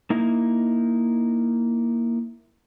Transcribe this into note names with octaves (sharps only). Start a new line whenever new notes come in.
A#3 D#4 E4